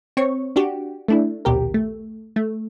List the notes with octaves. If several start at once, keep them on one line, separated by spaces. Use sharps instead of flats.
C4 C#5 C#6
D4 F#4 G4
A3 D4 E4
A#1 D#2 B2 G4 A#4
A3
A3